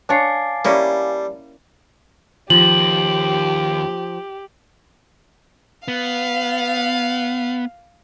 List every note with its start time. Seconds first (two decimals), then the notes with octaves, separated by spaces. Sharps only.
0.09 D4 C#5 F5 G#5 A5 D6 A6 C7
0.65 G3 A#3 C#4 E4
2.50 D#2 F3 G4 F#7
5.88 B3 F5